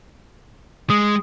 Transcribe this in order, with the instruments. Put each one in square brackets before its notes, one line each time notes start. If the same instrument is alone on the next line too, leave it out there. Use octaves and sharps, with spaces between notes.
[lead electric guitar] G#3 [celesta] D#6